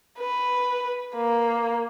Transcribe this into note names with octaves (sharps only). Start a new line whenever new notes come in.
B4
A#3